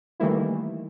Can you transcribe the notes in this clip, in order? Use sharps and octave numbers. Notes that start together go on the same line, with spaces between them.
D#3 E3 G3 A3 A#3 E4